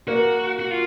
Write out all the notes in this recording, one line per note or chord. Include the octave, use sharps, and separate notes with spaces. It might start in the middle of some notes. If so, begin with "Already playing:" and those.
A#3 F#4
F#4
F4